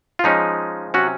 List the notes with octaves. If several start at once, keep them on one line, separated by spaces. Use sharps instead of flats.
F4
F3 G#3 C#4 D#4
C3 F#3 C#4 F#4